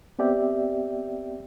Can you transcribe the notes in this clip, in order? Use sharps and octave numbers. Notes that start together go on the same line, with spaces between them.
B3 C4 G4 D5 E5 G5